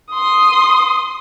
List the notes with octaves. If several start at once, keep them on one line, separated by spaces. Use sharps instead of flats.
C6 D#6